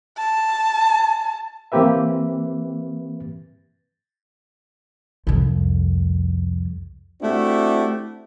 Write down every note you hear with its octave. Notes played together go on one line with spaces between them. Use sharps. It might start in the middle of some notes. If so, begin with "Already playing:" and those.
A5
E3 A#3 C4 G4 B4 E5
C2 F2
A3 C4 D4 E4 F#4 G4